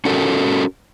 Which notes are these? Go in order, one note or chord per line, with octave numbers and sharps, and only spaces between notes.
C#4 F#4 A4 A#4